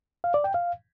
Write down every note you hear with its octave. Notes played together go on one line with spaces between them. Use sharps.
F5
D5
G5
F5